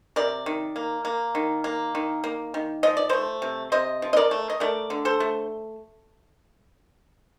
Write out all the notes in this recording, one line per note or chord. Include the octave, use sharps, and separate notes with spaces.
C3 A#4 D5
D#3
A#3
A#3
D#3
A#3
D#3
A#3
D#3
F3 D#5
D5
A3 C5 D#5
C3
C3 C5 D#5
F3
D#5
A#4 D5
A3
D#5
A3 A#4 D5
D3
A4 C5
A3